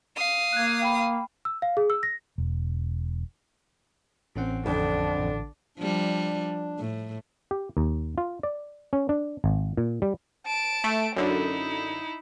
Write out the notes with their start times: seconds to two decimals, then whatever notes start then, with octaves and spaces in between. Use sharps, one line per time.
0.17 F5 D#6
0.53 A#3 F#6 G#6
0.82 G5 B5
1.45 E6
1.62 F5
1.77 G#4
1.90 E6
2.03 A#6
2.38 E1
4.36 A1 C4 C#4 F#5
4.66 F2 D3 D4
5.17 A1
5.78 F3 G3 D4
6.79 A2
7.51 G4
7.77 D#2
8.18 F4
8.43 D5
8.93 C#4
9.09 D4
9.44 G#1
9.77 A#2
10.02 G3
10.46 A5 D7
10.84 A3
11.16 F#2 D3 D#4 E4